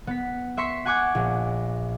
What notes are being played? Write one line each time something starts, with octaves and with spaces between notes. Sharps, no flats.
B3 B6
E5 C6 C#6 B6 C#7
F#5 G#5 C#6 D6 F#6 G#6
A#1